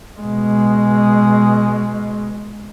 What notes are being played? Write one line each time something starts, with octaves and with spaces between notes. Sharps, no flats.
B2 G#3